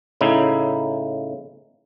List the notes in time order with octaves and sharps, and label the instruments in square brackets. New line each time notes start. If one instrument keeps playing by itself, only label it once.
[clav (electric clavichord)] A2 C#3 D#4 E4